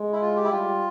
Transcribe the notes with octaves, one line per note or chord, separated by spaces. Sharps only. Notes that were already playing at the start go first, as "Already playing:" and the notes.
Already playing: G#3
E4
F4
G4
E4
G3 F4